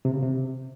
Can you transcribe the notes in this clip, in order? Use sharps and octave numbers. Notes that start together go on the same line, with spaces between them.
C3
C#3
C3